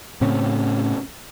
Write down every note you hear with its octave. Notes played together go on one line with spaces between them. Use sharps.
A2 C#3 C4 C#4